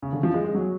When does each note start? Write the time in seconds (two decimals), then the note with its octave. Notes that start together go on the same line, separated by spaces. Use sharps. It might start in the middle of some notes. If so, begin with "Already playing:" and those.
0.02 C#3
0.13 D3
0.23 F3
0.34 G#3
0.44 G#3
0.55 F#3